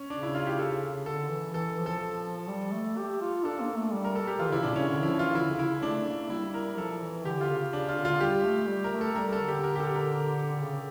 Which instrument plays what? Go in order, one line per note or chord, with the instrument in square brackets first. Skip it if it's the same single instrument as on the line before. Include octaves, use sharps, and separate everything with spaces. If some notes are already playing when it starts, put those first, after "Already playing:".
Already playing: [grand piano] C#4
[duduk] C#3 [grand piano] D4
[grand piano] E4
F4
G4
A4
[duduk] D3 [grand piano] A4
[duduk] E3
[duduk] E3 [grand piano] A4
[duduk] F3
[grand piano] A4
[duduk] G3
A3
G4
F4
[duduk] D4 [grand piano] A4
[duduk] A#3
A3
G3
[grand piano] A#4
A4
G4
[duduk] E3 [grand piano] F4
[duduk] C#3 [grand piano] E4
[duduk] A#2 [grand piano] D4
[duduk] C#3 [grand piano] C#4
[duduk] D3
[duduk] F3 [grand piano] E4
[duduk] E3 [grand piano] F4
[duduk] D3 [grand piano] E4
[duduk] C#3
[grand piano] E4
[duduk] C#3
[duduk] A3 [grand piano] D4
[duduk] A#3
[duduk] G3 [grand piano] E4
[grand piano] A#4
[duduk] F3 [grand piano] A4
[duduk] E3
[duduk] D3 [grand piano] G4
[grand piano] F4
[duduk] C#3
[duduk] C#3 [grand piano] D4
[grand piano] F4
[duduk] D3
[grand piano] F4
[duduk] G3 [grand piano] G4
[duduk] A3
G3
[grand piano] A#4
[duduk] A3
[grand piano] A4
[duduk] A3
[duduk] G3 [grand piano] A#4
[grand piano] A4
[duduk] D3
[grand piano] G4
A#4
G4
A4
A#4
[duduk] C#3